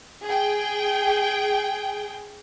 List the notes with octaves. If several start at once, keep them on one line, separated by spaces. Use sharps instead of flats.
G#4 G5